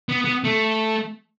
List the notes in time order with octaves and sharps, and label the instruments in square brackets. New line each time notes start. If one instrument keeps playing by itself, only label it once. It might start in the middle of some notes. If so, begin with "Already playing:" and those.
[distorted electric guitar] B3
B3
A3